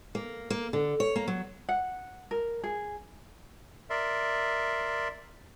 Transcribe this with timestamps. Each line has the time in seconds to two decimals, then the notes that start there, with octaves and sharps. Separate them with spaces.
0.15 A#3
0.50 A#3
0.73 D3
1.00 C#5
1.16 A#3
1.28 F#3
1.69 F#5
2.31 A#4
2.63 G#4
3.90 A#4 D5 E5 C6